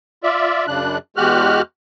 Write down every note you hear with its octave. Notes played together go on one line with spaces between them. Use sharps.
F4 D5 E5
F#2 C#3 D4 F#6
E2 G#3 F#4 G4 F6 F#6